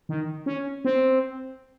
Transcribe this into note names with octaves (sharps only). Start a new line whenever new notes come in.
D#3
C#4
C4